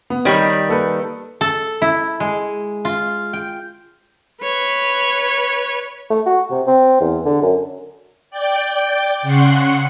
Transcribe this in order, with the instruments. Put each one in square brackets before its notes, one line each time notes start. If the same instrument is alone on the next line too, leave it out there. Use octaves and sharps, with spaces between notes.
[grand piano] B3
[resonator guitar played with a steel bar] D#3 G3 [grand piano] C#5
[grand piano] A#3 A4 B4
[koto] A4
E4
G#3
F4
G5
[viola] B4 C#5
[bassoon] A3
F#4
C3
C4
E2
D3
F#2
[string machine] D5 G5
C#3 F#5 C6 C#6